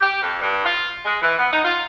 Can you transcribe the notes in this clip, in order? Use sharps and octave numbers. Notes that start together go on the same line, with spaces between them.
G4
F2
G2
F4
G#3
E3
B3
D#4
F4